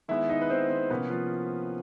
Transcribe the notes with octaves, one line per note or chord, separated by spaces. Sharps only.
D#3 G#3 B3 E4 E5
D#4 D#5
B4
C4 C5
C4 C5
C3 F3 A#3 B3 C#4 B4
F3 F4